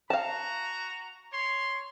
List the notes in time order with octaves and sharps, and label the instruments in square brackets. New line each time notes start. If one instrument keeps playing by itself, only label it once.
[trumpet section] F#4 A#5 [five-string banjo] F5 A5
[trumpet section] C#5 C6